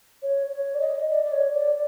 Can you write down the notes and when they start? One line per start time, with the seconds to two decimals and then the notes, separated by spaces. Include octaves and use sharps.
0.23 C#5
0.51 C#5
0.75 D5
0.81 D#5
1.10 D5
1.25 D5
1.32 C#5
1.54 D5